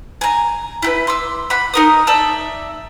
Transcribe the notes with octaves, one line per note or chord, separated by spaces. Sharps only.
G#5 A#5
E4 G4 B4
C6 D6 E6
F#5 B5
D#4 A#4 D#6
D5 E5 A5 E6